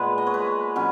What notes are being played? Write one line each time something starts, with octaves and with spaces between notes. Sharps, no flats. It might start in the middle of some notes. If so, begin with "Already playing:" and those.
Already playing: A#2 G#3 B3 B4
D#5
C#5
B4
B2 F#3 C#4